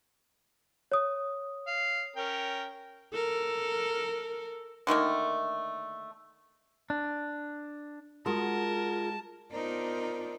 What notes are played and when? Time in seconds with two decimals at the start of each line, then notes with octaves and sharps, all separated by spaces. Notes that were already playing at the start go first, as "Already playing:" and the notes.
0.92 C#5 D#6
1.67 F5
2.16 C#4 A#4 G5
3.13 A4 A#4
4.87 D3 D#3 A3 A#3
6.90 D4
8.26 G#3 F4 F#4 G#4 A#4 A5
9.52 B3 D4 D#4 F4 A#4 C5